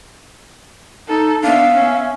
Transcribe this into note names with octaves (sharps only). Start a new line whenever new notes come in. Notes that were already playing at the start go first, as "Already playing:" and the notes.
D#4 A4
B3 D4 E5 F5
C#4